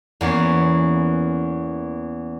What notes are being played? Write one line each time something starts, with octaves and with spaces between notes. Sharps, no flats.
E2 A#3 B3 C#4